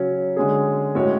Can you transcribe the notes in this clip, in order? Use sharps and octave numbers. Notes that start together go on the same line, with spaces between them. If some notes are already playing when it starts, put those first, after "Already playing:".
Already playing: C#3 F#3 C#4
D3 G#3 C#4 G#4
A2 G#3 C#4 F#4 C#5